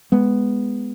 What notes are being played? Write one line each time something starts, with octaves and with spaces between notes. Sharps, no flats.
G#3 B3